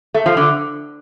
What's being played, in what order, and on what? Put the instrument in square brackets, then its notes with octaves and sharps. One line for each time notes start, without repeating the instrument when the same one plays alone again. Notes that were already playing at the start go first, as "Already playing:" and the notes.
[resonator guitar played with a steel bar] A3
F3
D3